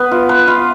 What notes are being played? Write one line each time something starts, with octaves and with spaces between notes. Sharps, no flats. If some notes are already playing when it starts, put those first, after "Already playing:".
Already playing: B3 B4
F4
B4
F4